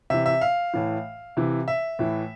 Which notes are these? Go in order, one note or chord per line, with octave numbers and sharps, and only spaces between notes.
C3 E3 E5
E5
F5
A2 E3
C3 E3
E5
A2 E3